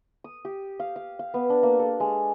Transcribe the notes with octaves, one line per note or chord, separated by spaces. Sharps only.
D#6
G4
F5
F5
F5
B3
D4
A#3
A4
G#3